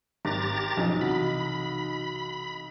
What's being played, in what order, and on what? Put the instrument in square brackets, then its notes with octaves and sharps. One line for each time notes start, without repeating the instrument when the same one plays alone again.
[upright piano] G#1 [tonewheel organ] G4 A#5 A6
[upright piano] B1 D#4 [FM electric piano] F3 C#4
[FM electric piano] C3 E3 F#4 [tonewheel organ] B5